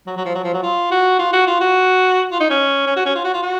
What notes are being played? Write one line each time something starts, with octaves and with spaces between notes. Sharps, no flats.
F#3
F#3
F3
F#3
F3
F#3
F4
F#4
F4
F#4
F4
F#4
F4
D#4
C#4
C#4
F#4
C#4
F4
F#4
F4
F#4